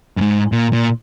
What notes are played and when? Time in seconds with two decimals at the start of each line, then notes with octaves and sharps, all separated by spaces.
0.17 F#2
0.21 G#2
0.52 A#2
0.73 A#2